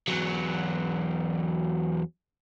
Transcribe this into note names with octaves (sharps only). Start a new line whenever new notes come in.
E2 F#3